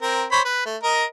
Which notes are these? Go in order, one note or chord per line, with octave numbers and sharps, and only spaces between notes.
C4 A#4
C5 C#5 B5
B4
A3
A#4 D#5